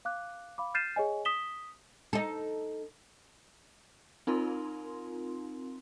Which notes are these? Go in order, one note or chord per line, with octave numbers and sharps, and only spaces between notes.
F5 D6 F#6
F5 B5 D6
F6 G6 A6 C7 D#7 E7
G#4 C#5 D#5 G#5
D#6 B6 E7 G7
D#4 A4
C4 D#4 F4 A#4 C6